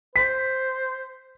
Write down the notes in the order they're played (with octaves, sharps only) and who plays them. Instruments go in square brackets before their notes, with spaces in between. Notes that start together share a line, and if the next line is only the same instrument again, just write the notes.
[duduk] C5 [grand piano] B6